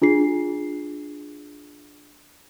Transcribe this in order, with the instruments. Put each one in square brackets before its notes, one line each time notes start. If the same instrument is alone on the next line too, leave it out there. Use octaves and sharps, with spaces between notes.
[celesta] D4 F4 G#4 C7